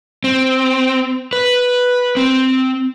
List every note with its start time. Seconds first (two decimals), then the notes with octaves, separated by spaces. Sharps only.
0.24 C4
1.33 B4
2.17 C4